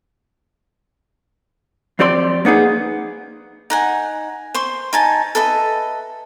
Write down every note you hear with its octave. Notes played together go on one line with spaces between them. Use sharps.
F2 C4 G4 D5 B5 C6
A#3 B3 D#4 G#4
D#4 F#5 G#5
C5 C6 C#6
D#4 G#5 A5
A4 B4 D#5 E5